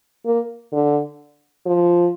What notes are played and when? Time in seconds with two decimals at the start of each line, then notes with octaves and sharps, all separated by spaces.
0.25 A#3
0.72 D3
1.66 F3